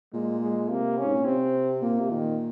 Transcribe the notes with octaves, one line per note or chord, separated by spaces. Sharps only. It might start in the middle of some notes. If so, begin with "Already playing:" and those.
A#2 G#3
G#3
C3 A#3
C#4
G#2
A#2
C3 C4
A#2 A#3
C3
A#2 D#3